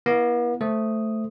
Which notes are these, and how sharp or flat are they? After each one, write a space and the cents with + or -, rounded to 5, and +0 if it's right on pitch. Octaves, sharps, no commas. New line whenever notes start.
B3 -45 E4 +0
A3 +0 C5 +0 D#6 +0